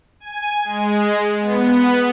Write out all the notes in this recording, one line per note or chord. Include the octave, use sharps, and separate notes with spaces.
G#5
G#3
B3